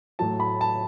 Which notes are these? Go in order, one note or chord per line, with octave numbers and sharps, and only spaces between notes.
A2 F#3 A5
B5
A5